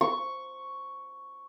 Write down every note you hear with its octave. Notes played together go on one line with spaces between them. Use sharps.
C#6